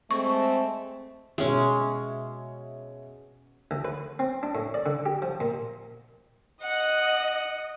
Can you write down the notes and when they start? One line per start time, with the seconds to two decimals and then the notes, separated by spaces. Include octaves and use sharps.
0.11 G#3 A3 C4 C#6
1.38 B2 G#3 C#4 C#5 E5
3.71 D2
3.85 B4
4.19 C4
4.43 D4
4.55 A2
4.74 D5
4.86 D3
5.06 G4
5.22 F3
5.40 A#2
6.63 D#5 F#5